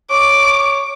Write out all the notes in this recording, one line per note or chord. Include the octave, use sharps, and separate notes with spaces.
C#5 D6